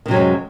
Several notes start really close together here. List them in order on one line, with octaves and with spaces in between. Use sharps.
D#3 C3 F#3 F#2 G#3